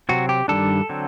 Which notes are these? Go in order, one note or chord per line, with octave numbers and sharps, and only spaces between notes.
C3 F#3 C4 F#4
G4
G2 D#3 G3 D4 A4
D3 F#3 C4